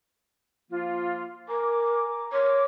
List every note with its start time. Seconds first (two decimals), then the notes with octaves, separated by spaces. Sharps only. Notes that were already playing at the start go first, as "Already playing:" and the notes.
0.71 F3 A#3 F4
1.49 A#4 G#5 A#5 D6
2.33 A#4 C#5 C6 D6